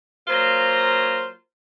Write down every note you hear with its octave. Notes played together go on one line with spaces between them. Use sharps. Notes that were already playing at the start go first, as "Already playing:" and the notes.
F#3 A#3 F4 C5 A#5